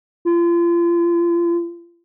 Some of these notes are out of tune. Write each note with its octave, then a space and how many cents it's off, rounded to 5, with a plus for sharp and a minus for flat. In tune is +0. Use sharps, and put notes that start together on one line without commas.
F4 -35